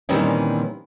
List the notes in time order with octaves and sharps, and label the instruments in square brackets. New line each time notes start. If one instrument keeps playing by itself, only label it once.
[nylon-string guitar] A#2 D#3 E3 G3 C4 C#4